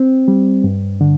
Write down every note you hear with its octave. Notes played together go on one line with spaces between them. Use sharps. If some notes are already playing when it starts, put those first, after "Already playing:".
Already playing: C4
G3
G2
D3